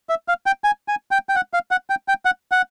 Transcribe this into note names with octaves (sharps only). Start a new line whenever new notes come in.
E5
F5
G5
G#5
G#5
G5
G5
F#5
F5
F#5
G5
G5
F#5
F#5